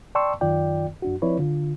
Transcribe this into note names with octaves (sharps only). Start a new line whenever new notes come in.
D5 G5 A5 C6 C#6 E6
F#2 D#3 F4 D5 G5
F#2 D4 F#4
F3 C4 E4 B4 C#5 D5
D3 F4